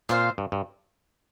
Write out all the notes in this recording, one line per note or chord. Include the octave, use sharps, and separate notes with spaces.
A#2 C4 F4 C5 F5
G2
G2